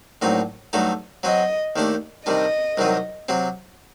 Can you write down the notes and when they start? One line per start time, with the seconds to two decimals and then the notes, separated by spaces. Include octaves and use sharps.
0.22 A#1 A2 F#3 C4 D#4
0.73 G2 F#3 A3 D#4 A4
1.23 F#3 C4 F#4 D#5
1.76 D#2 D#3 A3 D4 G4
2.26 C3 D#3 G3 D4 D#5
2.77 C2 C3 D#3 F#3 C4
3.29 C3 F#3 C4